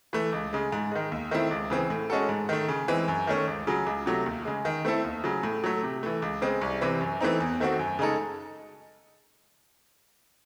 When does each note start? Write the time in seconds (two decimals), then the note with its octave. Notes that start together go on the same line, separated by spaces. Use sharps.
0.13 E3 A3
0.32 C#2
0.53 C#3 G#3
0.72 G#2
0.92 D#3 G#3
1.12 D#2
1.31 D#3 A3 C4 E4
1.51 C#2
1.70 C#3 E3 C4
1.90 A2
2.10 G#3 C#4 F#4 A4
2.29 G#2
2.49 D#3 A3
2.68 C#3
2.88 E3 G#3 C4
3.08 F#2
3.27 D#3 A3 C#4
3.47 C#2
3.67 C#3 F#3
3.86 C#2
4.06 C3 F#3 A3
4.26 D#2
4.45 C#3 G#3
4.65 D#3
4.85 A3 C4 E4 A4
5.04 D#2
5.24 C#3 F#3
5.43 A2
5.64 F#3 A3
5.83 C3
6.03 E3 A3
6.22 C#2
6.42 C#3 G#3 C4
6.61 C2
6.81 C3 E3 C4
7.01 F#2
7.21 E3 A3 C4 D#4
7.40 E2
7.60 D#3 A3 C4 F#4
7.79 F#2
7.99 C#3 G#3 D#4 A4